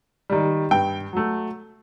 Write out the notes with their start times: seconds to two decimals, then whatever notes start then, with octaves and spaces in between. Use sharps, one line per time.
0.30 D#3 G3
0.71 G2 G5
1.13 F#3 A3